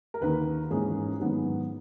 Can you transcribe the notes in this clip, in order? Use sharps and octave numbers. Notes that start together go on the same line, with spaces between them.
A#4
D#2 D#3 A#3 B4
G#2 E3 A#3 C#4 G#4
G#2 D#3 F#3 B3